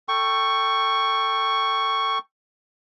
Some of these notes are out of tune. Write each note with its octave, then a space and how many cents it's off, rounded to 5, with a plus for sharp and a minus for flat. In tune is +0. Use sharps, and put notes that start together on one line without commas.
A4 +20 G5 +0 C#6 +0